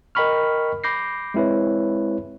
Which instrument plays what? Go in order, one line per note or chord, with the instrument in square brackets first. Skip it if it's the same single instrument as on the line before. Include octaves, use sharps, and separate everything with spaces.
[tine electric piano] A#4 D#5 G5 B5 C#6 F6
B5 D6 G6 A#6 C7
G#3 C4 E4 B4 C#5